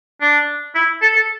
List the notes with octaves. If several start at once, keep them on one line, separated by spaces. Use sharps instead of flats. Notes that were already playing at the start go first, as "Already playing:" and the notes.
D4
E4
A4
A4